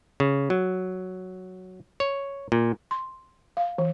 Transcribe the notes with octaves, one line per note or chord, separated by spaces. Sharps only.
C#3
F#3
C#5
A#2
C6
F5
E3